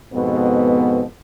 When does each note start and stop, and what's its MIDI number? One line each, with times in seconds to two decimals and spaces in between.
0.14 1.03 41
0.14 1.03 44
0.14 1.03 47
0.14 1.03 59